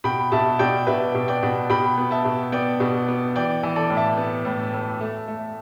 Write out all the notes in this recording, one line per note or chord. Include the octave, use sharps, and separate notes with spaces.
B2 G5 B5
B2 E5 A5
B2 D5 G5
B2 B4 E5
B2
D5 G5
B2
B2 G5 B5
B3
E5 A5
B2
B3 D5 G5
B2
B3
E3 D5 G5
E3
A4 D5
A2
E5 A5
B3
A2
A2
A3
A3